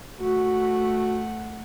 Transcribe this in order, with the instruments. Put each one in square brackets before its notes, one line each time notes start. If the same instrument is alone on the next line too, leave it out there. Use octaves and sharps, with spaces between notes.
[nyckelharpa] A3 F#5 [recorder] F#4